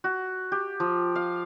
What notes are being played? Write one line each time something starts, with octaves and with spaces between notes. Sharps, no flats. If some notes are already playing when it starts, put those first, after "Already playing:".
F#4
G4
F3
F5